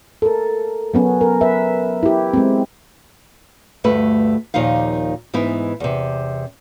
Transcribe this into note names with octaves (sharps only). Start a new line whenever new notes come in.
A4 A#4
F#3 B3 C#4
A#4
B4 E5
E4 G4
G#3 C4
D2 G2 A3 B4
D#2 A#2 F3 D#4 F5
G#2 E3 B3 D#4 E4
E2 C3